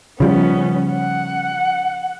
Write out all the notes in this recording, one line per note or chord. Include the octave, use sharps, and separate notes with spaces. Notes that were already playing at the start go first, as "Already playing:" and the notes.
C#3 F3 G3 B3 C#4
F#5